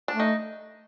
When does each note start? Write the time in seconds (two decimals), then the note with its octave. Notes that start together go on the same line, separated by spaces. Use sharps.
0.08 A3 D4
0.20 D#4